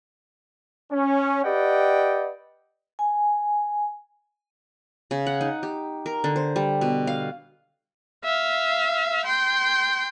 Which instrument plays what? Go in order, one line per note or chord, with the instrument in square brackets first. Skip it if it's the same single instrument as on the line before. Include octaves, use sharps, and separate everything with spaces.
[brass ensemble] C#4
G4 B4 D5 D#5 F#5 G5
[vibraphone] G#5
[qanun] C#3
F#5
D#4
G4
A#4
D3
C5
G3
B2
F5
[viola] E5 F5
G5 C6